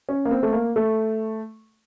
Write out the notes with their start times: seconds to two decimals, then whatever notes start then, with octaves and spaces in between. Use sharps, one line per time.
0.09 C#4
0.26 A#3
0.31 C4
0.43 A3
0.53 A#3
0.76 A3